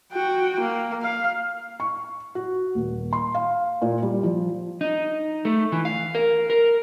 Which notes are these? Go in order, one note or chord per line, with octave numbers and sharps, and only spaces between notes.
F#4 G5
A#3
F5
C#6
F#4
D#1
C6
F5
A#2
G3
F3
D#4
A3
E3
F5
A#4
A#4